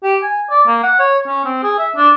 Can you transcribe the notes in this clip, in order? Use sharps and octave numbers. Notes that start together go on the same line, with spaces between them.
G4
G#5
D5
A#3
F#5
C#5
C#4
C4
G#4
E5
D4